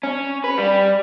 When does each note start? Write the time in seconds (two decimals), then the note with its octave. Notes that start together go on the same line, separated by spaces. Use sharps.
0.03 C#4
0.44 B4
0.58 G3